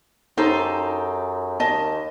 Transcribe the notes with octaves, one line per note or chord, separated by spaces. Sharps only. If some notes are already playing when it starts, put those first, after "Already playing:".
F#2 D#4 G4 A4 C5
D#2 D#5 A5